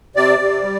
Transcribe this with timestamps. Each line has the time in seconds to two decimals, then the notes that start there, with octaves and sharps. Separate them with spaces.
0.16 C3 D5
0.39 C3
0.63 G3